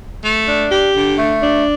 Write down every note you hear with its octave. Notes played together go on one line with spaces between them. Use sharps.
A3
D4
G4
D3
A3
D4